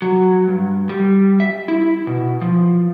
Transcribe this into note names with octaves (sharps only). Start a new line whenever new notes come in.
F#3
G2
G3
E5
E4
B2
F3